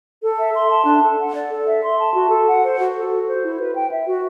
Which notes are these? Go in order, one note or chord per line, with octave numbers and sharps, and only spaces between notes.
A4
E5
C6
A5
D4
A4
F#5
D5
A4
E5
C6
A5
F#4
A4
F#5
C5
F#4
A4
F#4
C5
E4
B4
G5
E5
F#4